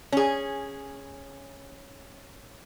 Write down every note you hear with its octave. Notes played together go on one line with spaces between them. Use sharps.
C#4 G#4